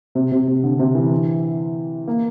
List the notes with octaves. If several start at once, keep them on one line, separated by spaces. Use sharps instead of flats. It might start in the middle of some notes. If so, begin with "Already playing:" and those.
C3
C3
C3
D3
C3
E3
A#3